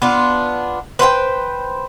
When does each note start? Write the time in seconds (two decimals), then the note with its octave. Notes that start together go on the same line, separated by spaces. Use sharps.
0.02 B3 D4 F4
0.99 B4 C5 F#5 G5